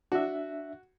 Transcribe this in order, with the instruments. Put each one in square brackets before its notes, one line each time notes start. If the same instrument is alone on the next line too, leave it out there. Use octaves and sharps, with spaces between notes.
[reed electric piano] D4 E5 [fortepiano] F#4